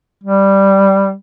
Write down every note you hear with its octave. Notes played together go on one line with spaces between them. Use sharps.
G3